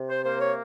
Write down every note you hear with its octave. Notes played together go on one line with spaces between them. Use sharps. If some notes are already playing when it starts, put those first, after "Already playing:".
Already playing: C3
C5
A#3 C5
C#5